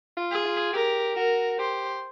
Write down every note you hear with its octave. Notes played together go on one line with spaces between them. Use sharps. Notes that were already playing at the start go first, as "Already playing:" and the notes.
F4
G#4
F4
G4 A#4
F#4 A#4
G4 C5